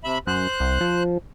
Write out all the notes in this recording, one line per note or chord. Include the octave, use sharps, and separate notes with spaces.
C3 E5 B5
F#2 C5 F#6
C2
F3